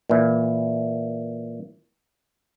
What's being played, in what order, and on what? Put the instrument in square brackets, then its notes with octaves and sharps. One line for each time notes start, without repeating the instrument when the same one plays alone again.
[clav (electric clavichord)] A#2 E3